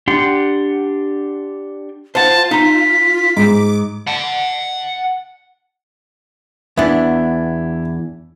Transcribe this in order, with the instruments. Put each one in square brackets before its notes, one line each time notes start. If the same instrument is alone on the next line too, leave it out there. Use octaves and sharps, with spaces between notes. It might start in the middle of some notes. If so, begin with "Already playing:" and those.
[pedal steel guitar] D4 G4 F#5 C6
[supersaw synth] F4 [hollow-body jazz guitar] C5 F#5 [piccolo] A5
[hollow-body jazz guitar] D#4 A#5 [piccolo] B6
[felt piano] G#2 [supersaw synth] D6
[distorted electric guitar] F#5 A5
[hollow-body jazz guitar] E2 B3 D4 [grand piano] E4